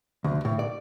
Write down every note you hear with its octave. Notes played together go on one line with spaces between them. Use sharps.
D2
A2
D5